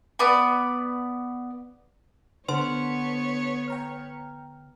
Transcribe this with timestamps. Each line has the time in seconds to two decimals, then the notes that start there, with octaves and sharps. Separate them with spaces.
0.19 B3 D5 B5
2.49 D3 B3 D4 C5 C#5 F#5 A5 C6
3.68 G5 A#5 F6